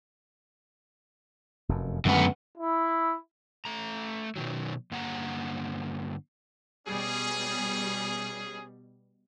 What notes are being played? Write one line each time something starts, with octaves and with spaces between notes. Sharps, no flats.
F1 F#2
F#2 D3 G#3 A3 B3
E4
A3 A#5
B2 D#3 F#3
G2 D3 A#3 F#5 G#5 A#5
B2 G3 C#4 G#4